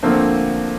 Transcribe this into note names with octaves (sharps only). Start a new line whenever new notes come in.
D3 F3 A3 A#3 C4